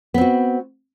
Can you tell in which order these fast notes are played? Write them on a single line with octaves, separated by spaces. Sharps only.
B3 C4 F#4